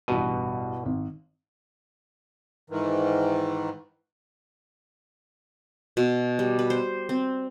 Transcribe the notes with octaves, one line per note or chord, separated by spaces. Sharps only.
A1 G2 B2 D#7
G#1
G#2 D#3 E3
B2
G3
B4
C5
C4